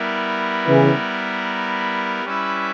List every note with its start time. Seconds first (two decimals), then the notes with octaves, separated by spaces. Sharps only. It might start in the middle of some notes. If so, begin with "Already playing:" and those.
Already playing: G3 B3 E4 A#4
0.67 C#3 E3
2.25 G3 C#4 E4 B4 E5